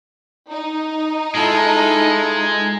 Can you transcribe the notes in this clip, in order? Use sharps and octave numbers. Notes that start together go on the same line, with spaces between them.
D#4
G#3 E4 F4 A4